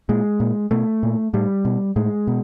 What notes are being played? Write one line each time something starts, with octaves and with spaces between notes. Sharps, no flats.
A#2 G#3
A#2
B2 A3
A#2
A2 G3
B2
A2 G#3
B2